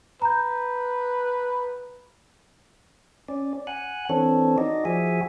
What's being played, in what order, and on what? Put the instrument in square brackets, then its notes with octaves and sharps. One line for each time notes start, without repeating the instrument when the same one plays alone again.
[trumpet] B4 [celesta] A#5 G6
[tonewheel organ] C#4 D5
F#5 G#5 F#6
E3 C4 D4 A4 C#5
D#4 F#4 D5 D#5
F3 F#4 G#4 E5 G#5